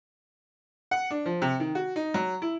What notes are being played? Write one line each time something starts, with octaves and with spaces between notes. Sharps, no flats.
F#5
D4
F3
C3
D#3
F#4
D#4
F#3
E4